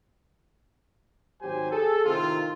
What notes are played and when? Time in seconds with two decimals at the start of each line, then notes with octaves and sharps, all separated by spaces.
1.41 G#1 F#3 G4 C5 G#5
1.72 G#4 A4
2.05 A2 C3 D#3 C4 F4